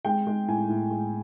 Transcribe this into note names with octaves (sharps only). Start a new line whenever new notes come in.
G#3 G5
G#3
A2 G#5
A2
G#3